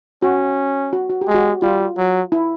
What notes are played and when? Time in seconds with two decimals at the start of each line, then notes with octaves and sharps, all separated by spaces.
0.22 C#4 F#4
0.93 F#4
1.10 F#4
1.21 G4
1.28 G#3
1.34 F#4
1.62 G3 F4
1.97 F#3
2.32 E4